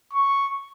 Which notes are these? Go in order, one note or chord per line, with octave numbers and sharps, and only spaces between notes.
C#6